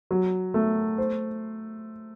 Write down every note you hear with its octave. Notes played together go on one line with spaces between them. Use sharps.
F#3
A3
C5